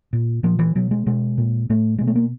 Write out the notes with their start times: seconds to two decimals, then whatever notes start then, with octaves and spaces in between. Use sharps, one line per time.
0.13 A#2
0.43 A#2 F3
0.59 E3
0.75 B2 F#3
0.91 G#3
1.06 B2 G#3
1.38 A#2
1.70 A2 A3
1.99 B2 G#3
2.07 A3
2.15 A#3